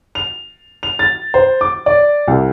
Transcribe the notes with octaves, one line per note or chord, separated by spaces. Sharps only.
F7
F7
A6
C5
D6
D5
C2